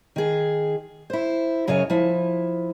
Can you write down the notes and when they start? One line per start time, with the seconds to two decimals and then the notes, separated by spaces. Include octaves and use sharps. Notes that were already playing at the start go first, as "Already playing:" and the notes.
0.16 D#3 G#4
1.10 E4 C5
1.68 F#2 C#3 C#5 D#5 G#5
1.90 F3 E4